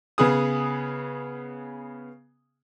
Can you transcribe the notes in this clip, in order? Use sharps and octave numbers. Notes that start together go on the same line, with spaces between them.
C#3 B3 G#4 D#6